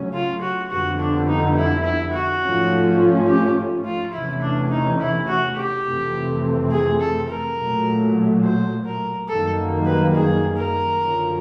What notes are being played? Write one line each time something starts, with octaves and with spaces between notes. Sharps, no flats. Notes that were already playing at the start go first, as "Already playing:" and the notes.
Already playing: C#3 F#3 A3 C#4
F4
F#4
F2 D3 G3 B3 F#4
D4
D#4
E4
E4
F#4
G#2 F3 A3 C#4
G4
F4
E2 C3 E3 A3 C#4 E4
D4
D#4
E4
F#4
G4
F2 C3 E3 A3 C4
G#4
A4
A#4
A#2 F#3 A3
C5
A#4
F#2 D#3 G3 A#3 A4
B4
G#4
A#4
F#2 D3 F3 A#3 C#4